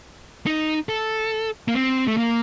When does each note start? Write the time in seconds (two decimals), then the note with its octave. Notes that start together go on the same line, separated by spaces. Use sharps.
0.46 D#4
0.89 A4
1.68 A#3
1.74 C4
2.07 A3
2.17 A#3